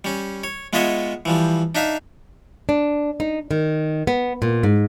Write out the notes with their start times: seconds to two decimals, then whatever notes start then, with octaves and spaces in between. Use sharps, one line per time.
0.04 G3 C#4
0.44 C#5
0.73 G#3 B3 F4 C#5 D#5 E5
1.25 E3 F3 G3
1.75 D4 D#4 E5 F5
2.69 D4
3.20 D#4
3.51 D#3
4.07 B3
4.42 A#2
4.63 G#2